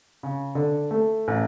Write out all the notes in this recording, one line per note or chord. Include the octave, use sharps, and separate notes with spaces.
C#3
D3
A3
A1